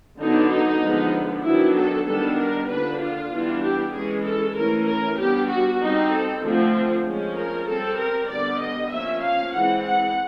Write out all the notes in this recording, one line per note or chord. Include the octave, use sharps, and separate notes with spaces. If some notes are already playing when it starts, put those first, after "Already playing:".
D3 F#3 B3 D4 D#4
D#4
D3 F3 G#3 B3
D#3 F#3 B3 D4 E4
A4
D#3 G3 B3 D4 A4
A#4
D3 F3 A#3 D4 B4
F4
E3 G3 B3 D4
G4
E3 G#3 C#4 G#4
A4
E3 A3 C#4 A#4
A#4
G3 B3 D4 G4
F#4
G3 C4 D#4
A4
D3 F3 A3 C4
F3 G#3 C#4
A#4
G3 C4 A4
A#4
D3 G3 B3 D5
D#5
F3 A#3 C#4 E5
F5
E3 G#3 C4 F#5
F#5